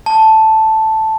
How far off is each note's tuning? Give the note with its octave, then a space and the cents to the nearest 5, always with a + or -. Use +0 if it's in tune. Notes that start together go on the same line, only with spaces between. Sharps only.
A5 +0